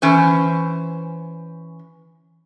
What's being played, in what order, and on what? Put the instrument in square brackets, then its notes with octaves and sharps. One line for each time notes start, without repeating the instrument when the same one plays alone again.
[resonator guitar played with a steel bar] E3 C#4 C5